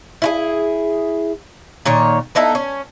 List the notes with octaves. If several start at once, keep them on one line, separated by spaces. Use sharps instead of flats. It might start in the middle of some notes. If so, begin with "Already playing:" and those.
E4 F4 G#4
A#2 D#3 C#5
B3 D#4 E4 A4
C#4